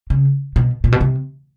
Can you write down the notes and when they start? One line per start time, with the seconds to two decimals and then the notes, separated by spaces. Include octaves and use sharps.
0.10 C#3
0.56 B2
0.84 A#2
0.92 B2
1.01 C3